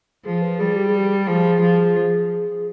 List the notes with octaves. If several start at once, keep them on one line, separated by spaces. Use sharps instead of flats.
F3 G#4
B4
G3 G#4
G4
G#4
G4
F3 G#4
F3